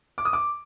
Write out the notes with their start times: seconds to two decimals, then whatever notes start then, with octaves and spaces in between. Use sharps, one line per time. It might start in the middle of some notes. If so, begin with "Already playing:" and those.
0.18 D6
0.25 D#6
0.33 D6